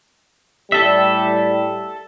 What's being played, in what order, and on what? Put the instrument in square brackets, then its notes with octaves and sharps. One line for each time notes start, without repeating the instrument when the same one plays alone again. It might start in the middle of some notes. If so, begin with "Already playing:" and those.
[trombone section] A2 G3 [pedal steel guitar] A4 E5